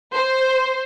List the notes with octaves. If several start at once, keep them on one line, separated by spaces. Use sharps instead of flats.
C5